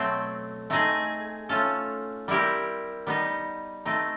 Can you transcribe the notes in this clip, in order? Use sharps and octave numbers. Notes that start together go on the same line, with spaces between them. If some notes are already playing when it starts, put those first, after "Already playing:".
Already playing: B2 F#3 A3 C4
A3 C4 D#4 G#4
A3 C#4 F4 A4
G3 C4 E4 G4 A#4
G3 B3 D#4
A3 C4 D#4